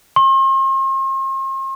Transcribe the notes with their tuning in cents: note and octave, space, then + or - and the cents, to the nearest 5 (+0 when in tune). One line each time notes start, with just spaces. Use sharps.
C6 +45